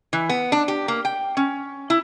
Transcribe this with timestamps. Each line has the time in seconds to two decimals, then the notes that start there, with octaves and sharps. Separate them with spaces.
0.13 E3
0.29 B3
0.52 D4
0.68 G4
0.88 A#3
1.05 G5
1.37 C#4
1.90 E4